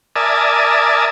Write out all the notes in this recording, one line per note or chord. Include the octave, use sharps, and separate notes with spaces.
A#4 D5 E5 G#5 A5 D#6